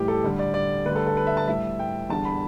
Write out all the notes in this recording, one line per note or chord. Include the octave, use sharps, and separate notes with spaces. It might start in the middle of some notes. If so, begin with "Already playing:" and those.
Already playing: A2 E3 G3 G4
A4
D2 D3 G3
D5
D5
D2 D3 G3 B4
A4
A4
B4
E5
A5
A2 G3 E5
G5
E2 D3 G3 A5
B5